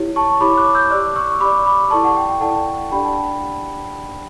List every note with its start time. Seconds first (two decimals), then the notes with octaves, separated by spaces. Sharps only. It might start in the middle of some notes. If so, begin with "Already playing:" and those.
Already playing: E4 G4 C#5
0.16 A5 C#6
0.40 E4 G4 C#5 B5 D6
0.57 D6 F#6
0.74 E6 G6
0.91 D5 D6 F#6
0.94 G4
1.16 C#6 E6
1.40 G4 B5 D6
1.44 D5
1.66 B5 D6
1.90 E4 A4 D5 A5 C#6
2.03 F#5 A5
2.17 G5
2.28 G5
2.41 E4 A4 D5 F#5 A5
2.91 D4 G4 D5 G5 B5
3.04 F#5 A5